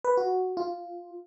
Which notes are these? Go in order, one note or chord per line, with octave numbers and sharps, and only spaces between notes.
B4
F#4
F4